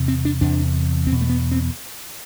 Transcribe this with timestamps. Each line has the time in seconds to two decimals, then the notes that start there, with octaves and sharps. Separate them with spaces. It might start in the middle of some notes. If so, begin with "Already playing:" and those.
Already playing: E2 C3
0.08 C4
0.25 D4
0.41 E2 C3 D4
1.07 E2 C4
1.12 B2
1.21 A3
1.29 B3
1.52 C4